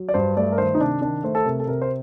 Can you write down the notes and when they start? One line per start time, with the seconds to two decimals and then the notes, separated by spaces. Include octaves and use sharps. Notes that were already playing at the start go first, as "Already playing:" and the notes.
Already playing: F#3
0.09 D5
0.14 G2 C5
0.37 A3 D5
0.52 A#4
0.58 D#3 C5
0.75 D#4
0.80 C3 D4
1.01 D#3 D4
1.23 A3 C5
1.35 A4
1.45 C3 A#4
1.60 A4
1.67 C3 A#4
1.82 C5